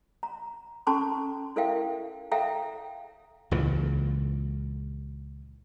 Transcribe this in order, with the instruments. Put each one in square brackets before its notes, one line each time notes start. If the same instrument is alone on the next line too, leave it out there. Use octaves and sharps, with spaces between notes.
[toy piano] A#5
C#4 A4 A5 A#5 C6 C#6
E4 A4 A#4 E5 F5 G5
A4 E5 F5 G5 A#5
[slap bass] C#2 A#2 E3